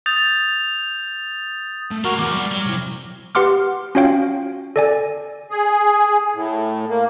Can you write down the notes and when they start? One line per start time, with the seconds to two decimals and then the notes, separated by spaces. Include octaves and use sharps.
0.06 D#6 G6 A6 F7
1.91 A3
2.04 G#3 A#3 F#4 A#4 A#5
2.19 E2 D6 F6
2.34 G3
2.51 F#3
2.66 C3 E4
3.35 G4 B4 F#5 C6 D6 F6
3.95 C#4 F4 F#4 C#5 F5 G5
4.76 A4 D5 G#5
5.51 G#4
6.34 A2
6.89 A#3